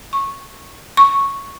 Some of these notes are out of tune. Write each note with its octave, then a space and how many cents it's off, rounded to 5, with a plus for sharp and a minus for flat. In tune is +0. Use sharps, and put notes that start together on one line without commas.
C#6 -15
C#6 -5